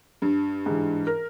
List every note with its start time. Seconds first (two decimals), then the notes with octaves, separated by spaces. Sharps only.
0.22 G2
0.66 G#2 E3
1.07 A#4